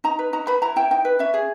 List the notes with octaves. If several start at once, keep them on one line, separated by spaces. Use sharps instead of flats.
D#4 A#5
B4
D#4 A#5
B4 B5
E4 A#5
E4 G5
D#4 G5
B4
C#4 E5
G#4